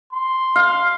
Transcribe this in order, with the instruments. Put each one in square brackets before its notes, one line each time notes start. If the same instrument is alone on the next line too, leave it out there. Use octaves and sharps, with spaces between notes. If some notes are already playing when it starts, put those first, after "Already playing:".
[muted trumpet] C6
[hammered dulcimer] F5